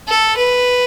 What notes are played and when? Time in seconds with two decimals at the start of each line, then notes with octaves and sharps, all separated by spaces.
0.08 A4
0.37 B4